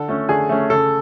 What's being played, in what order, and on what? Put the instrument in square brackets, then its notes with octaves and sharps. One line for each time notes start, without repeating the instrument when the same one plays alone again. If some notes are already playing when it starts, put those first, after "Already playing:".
Already playing: [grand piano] D3 A4
A3 C#4
D3 G#4
A3 C#4
C#3 A4